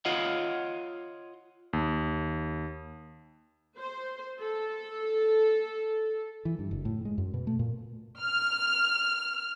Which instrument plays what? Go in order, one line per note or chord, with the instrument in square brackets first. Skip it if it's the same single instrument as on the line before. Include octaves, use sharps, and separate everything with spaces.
[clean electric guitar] F4 C#5 D#5 F5 F#5
[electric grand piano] D#2
[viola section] C5
A4
[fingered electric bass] E3
G2
F#1
A2
G#3
F#2
B2
A3
A#2
[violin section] F6